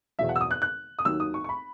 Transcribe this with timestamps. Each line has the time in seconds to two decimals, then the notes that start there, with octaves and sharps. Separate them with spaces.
0.19 E2 B2 F#3 E5
0.29 F#5
0.36 E6
0.41 D#6
0.51 F#6
0.62 F#6
0.99 D#6
1.05 D#2 D#3 F#3 E6
1.20 D#6
1.34 C#6
1.44 C#6
1.49 B5